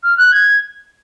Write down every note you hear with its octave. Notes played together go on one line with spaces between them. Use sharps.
F6
F#6
G#6